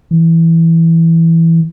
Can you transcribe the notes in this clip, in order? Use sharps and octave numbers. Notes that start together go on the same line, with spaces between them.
E3